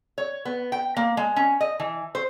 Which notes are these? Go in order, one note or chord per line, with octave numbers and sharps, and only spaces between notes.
C#5
B3
G5
A#3
G#3
C#4
D#5
E3
C5